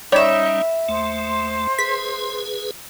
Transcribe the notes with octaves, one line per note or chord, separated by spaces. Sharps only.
G3 C#4 D#4 C#5 D5 E5 G5 B5
D#2 A3 C5 C6
G#4 B4 B6